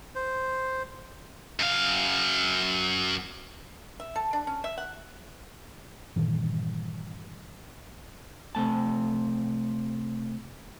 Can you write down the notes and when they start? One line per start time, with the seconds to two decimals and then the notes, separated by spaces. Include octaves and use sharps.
0.15 C5
1.59 F#2 F5
4.00 E5
4.16 A4
4.33 D4
4.47 C#4
4.64 E5
4.78 F#5
6.16 G2 A#2 D#3 E3
8.55 C3 A3 A5